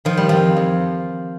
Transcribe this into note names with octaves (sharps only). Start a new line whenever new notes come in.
D#3 F3
G3
F2 F3
F2